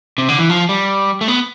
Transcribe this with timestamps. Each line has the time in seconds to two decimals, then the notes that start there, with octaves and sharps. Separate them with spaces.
0.18 C3
0.29 D3
0.38 E3
0.50 F3
0.69 G3
1.21 A3
1.28 B3